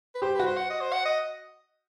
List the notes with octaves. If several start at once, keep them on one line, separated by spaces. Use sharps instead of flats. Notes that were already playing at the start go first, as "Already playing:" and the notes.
B4
G4 C5
B4
F#4
C5
F#5
D#5
C5
F#5
D#5